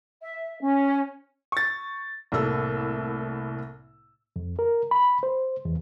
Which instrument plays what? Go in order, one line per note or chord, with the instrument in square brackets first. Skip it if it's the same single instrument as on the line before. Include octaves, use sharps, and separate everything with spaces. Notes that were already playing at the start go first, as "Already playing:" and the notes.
[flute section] E5
C#4
[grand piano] C#6 A6
[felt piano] C2 A2 A#3 A4 E6
[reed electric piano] F2
A#4
B5
C5
E2